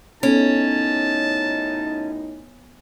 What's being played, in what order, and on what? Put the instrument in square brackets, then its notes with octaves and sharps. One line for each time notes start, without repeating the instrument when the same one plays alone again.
[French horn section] F#2 A2 D#4 [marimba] B3 A4 [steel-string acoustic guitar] C#4 [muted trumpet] A5